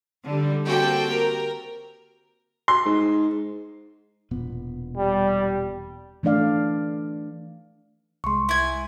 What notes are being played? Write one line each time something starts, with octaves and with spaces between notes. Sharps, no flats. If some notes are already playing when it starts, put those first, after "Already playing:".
D3 G3
A#3 C4 F#4 G4 A4 G5
A#4
C6
G#2
E1 A#2 B3
G3
E3 A3 D4 D5 F5
C2 G#3 C6 C#6
E4 G#5